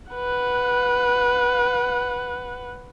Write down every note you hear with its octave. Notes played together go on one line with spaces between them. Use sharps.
B4 F#5